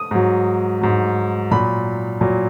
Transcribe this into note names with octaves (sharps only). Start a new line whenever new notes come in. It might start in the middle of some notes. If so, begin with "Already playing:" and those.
Already playing: D#6
G#2 F#3
G#2 F#3
A#2 F#3 B5
A#2 F#3